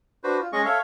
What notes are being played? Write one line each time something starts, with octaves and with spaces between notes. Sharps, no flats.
D4 F#4 B4 C5
F4
G#3 C#4 G#4 D#5 C#6
A4 C#5 E5 F5